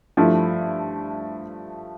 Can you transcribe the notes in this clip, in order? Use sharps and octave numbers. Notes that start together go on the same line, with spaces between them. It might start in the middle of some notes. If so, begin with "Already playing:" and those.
G2 F3 A3 E4